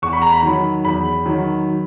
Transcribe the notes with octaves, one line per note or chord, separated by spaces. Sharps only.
E2 C#6
B5
A#5
B5
D#3 F#3
E2 B5
D#3 F#3